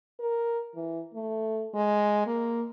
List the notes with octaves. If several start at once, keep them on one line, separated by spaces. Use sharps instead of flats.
A#4
E3
A3
G#3
A#3